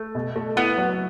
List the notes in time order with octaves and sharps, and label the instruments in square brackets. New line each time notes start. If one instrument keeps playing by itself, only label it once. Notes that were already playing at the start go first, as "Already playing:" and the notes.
Already playing: [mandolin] A3
[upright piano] B2
A3
[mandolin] B3 [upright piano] E4
[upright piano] F#3